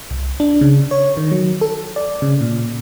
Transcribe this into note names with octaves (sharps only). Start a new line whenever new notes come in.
C2
D4
C#3
C#5
D#3
F#3
A4
D5
C#3
A#2